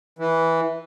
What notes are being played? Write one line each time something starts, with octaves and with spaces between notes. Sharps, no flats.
E3